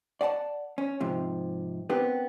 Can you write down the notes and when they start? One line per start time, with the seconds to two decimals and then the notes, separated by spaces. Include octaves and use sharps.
0.21 D5 F#5 G#5 A5
0.78 C#4
1.00 G#2 C3 F3
1.90 B3 C4 D4 G4 A#4 B4